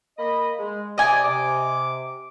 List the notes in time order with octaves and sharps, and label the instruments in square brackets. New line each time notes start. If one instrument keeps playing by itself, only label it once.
[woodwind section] A#3 D#5 B5
G#3
[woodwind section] C3 D5 D6 [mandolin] D#5 G#5
[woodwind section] C3 D6